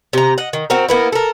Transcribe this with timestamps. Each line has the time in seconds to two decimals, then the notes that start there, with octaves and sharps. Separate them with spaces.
0.13 C3 A#5
0.38 D#5 F#5
0.53 D#3
0.70 C4 F#4 A#4
0.89 A#3 B3 E4
1.12 A4 A#4